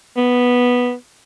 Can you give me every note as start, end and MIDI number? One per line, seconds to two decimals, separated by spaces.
0.17 0.93 59